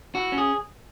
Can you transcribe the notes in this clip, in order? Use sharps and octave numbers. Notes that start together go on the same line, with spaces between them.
E4 F#4
C#4
G#4